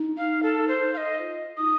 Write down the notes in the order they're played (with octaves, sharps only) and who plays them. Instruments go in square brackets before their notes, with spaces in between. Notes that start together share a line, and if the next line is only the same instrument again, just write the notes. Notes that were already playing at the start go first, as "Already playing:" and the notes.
Already playing: [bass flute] D#4
[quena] F5
A4
C5
F5
D#5
[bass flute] F4
[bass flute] D#4 [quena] D#6